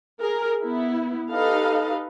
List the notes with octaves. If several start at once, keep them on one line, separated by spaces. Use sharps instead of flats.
G#4 A#4
B3 E4
D#4 G4 A4 B4 D#5 F5